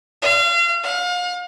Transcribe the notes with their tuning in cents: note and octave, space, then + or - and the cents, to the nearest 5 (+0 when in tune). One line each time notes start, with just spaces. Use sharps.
F5 -35
F5 +35